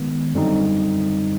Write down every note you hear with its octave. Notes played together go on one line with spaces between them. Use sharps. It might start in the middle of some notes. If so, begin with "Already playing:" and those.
Already playing: D#3 G#3 B3
F#2 D3 G3 C4 D#4